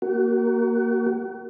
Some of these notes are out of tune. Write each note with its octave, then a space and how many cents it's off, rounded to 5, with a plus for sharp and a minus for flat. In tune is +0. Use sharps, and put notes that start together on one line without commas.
A#3 +0 F#4 +35